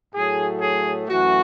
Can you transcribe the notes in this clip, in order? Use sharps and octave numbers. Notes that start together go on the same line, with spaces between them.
A2 F#3 A3 G#4
G#4
F#2 E3 A3 F#4